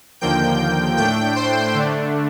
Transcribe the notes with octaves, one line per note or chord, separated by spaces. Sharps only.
D#2 D3 F3 A#3 G5 G6
A2 A3 D4 G5 G6
C5 C6
D3 A3 D4